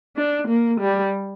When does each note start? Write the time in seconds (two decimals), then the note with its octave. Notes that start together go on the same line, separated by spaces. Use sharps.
0.16 D4
0.48 A#3
0.80 G3